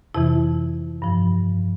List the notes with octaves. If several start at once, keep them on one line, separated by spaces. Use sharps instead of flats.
F2 C3 E3 E4
G2 F3